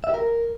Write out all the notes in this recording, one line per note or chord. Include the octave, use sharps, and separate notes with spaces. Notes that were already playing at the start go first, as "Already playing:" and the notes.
E5
G4
A#4